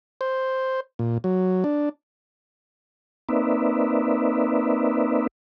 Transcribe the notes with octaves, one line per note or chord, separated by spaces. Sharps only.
C5
A#2
F#3
D4
A#3 C4 D#4 B4 D5 E5